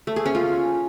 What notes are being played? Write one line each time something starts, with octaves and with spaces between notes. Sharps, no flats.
A3
G#4
C#4
F4